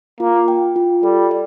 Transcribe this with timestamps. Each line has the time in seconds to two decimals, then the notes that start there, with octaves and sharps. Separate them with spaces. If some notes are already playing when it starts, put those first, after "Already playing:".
0.20 A#3 F4
0.48 G5
0.76 F4
1.03 G3 A4
1.31 D5